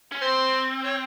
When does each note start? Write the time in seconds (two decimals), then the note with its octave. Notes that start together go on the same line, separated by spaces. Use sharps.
0.12 C#4
0.21 C4 C5
0.84 C#5